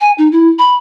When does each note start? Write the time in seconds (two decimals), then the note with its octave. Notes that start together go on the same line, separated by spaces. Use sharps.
0.01 G#5
0.18 D#4
0.32 E4
0.59 B5